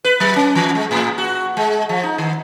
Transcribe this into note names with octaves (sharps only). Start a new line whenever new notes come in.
B4
F#3
C#4
E3
G#3
A2
F#4
G#3
F3
D#4
D#3